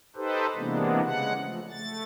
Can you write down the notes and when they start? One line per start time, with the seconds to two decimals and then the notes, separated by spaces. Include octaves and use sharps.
0.16 D#4 G4 A4 B4 C5
0.56 C3 E3 G#3 A#3 B3 D4
1.03 C#3 G#3 F#5
1.42 F3 A3
1.71 A3 A6